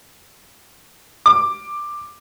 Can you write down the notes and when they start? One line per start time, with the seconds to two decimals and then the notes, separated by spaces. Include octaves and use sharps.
1.26 D6